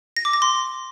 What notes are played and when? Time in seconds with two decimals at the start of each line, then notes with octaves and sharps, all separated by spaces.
0.17 A#6
0.25 D6
0.33 A#6
0.42 C6